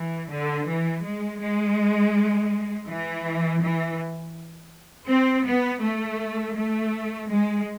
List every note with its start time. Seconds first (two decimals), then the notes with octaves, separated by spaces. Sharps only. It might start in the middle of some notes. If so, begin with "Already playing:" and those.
Already playing: E3
0.31 D3
0.68 E3
1.04 G#3
1.41 G#3
2.88 E3
3.61 E3
5.08 C4
5.45 B3
5.82 A3
6.55 A3
7.29 G#3